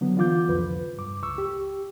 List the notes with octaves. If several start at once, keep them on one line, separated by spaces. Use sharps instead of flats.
D3 F#3 B3
D3 E3 F4 D6 G6
C2 F2 F3 B4
G2 D6
C#2 C#6 E6
G4